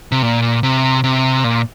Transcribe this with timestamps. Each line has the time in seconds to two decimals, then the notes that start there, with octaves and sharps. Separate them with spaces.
0.12 C3
0.22 A#2
0.63 C3
1.04 C3
1.44 A#2